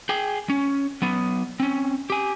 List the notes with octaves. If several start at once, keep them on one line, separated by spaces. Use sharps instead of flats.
G#4 G5
C#4
F#3 B3
C4 C#4
G4 G#5